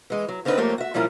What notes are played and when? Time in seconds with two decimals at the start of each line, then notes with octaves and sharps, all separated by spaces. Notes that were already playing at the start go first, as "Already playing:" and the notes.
0.10 E3 G#3
0.28 F#3
0.45 D3 C4 C#4 D#4 F#4 B4
0.57 F2 A3 A#3 G4 C#5
0.78 F#4 E5
0.94 A#2 F3 G3 C#4 E4 A#4